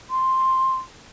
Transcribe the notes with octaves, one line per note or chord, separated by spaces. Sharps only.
C6